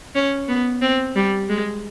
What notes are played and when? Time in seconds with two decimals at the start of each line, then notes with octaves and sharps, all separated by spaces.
0.15 C#4
0.48 B3
0.82 C4
1.16 G3
1.49 G#3